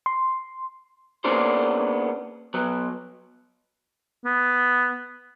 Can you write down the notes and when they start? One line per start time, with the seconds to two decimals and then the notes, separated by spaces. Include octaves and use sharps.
0.06 C6
1.24 A#3 B3 C#4 D4 G#4 C5
2.54 F#3 B3
4.25 B3